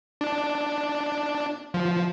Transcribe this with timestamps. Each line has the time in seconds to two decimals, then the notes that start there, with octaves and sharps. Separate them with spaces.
0.21 D4
1.74 F3